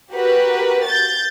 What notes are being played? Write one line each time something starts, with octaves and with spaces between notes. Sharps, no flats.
F#4 G4 A#4 B4
G6 A6